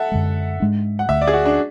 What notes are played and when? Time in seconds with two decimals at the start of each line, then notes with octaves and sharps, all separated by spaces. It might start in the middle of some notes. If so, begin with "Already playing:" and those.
Already playing: A4 E5 F#5
0.12 F#2 D3 G#3
0.60 G#2 G#3 D4
0.99 F#5
1.08 D2 D3 A3 E5
1.21 D5
1.28 G#4
1.33 F#4
1.45 D4